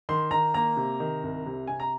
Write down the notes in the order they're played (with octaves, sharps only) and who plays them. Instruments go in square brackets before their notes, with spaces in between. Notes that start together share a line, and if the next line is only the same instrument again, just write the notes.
[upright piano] D#3 C6
D#3 A#5
A#3 A#5
C3
D#3
C2
C3
C3 G#5
A#5